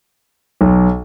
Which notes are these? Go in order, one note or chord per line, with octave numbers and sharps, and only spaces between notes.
B1